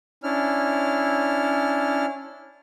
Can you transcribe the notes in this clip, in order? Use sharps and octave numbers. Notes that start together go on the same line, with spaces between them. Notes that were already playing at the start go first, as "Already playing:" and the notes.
C#4 D4 E4 F6